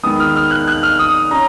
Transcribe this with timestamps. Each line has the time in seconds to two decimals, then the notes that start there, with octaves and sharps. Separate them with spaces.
0.03 D#3 G#3 B3 D#6
0.20 F6
0.36 F6
0.51 F#6
0.68 F#6
0.83 F6
0.99 D#6
1.31 C#4 A#5